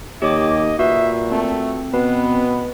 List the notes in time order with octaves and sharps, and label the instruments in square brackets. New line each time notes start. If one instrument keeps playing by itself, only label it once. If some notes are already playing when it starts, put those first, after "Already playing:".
[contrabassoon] D#2 [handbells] G4 C#5 D6 [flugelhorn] D#5
[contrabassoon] A#2 [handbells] F#4 B4 [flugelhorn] E5
[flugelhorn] A3 [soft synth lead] C4
[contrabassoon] B2 [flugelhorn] B3 [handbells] B4